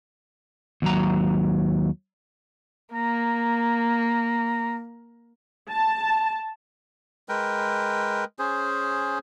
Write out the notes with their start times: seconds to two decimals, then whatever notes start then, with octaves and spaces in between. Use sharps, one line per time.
0.82 D#2 F#3 A#5
2.94 A#3 A#5
5.68 A5
7.29 G#3 A#4 B4 G5
8.39 C#4 G#4 C5